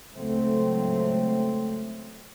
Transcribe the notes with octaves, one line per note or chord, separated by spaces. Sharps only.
C#2 F#3 A3 C4